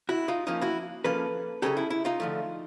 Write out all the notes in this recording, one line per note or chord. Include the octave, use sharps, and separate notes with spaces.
E4 F#4
D#4 F4
F3 A#3 C#4 D#4 F4
E4 F#4
F3 A#3 C#4 A4 B4
C#3 F#3 B3 D#4 G4 A4
E4
E4
D#4 F4
D3 F3 A3